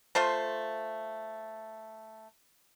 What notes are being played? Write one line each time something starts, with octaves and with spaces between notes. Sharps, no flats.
A3 F4 C5 A5